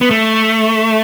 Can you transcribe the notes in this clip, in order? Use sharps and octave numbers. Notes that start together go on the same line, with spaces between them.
B3
A3